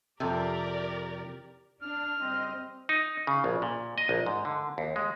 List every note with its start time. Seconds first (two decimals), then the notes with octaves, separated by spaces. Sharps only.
0.20 F2 C3 G4 A4 A#4 D5 E5
1.82 D4 F6
2.21 F#1 G3 C4 D#5
2.89 D#4
3.27 C#3
3.44 A#1
3.62 A#2
3.98 D#5
4.09 A#1
4.26 G#2
4.45 D3
4.78 D#2
4.96 G#3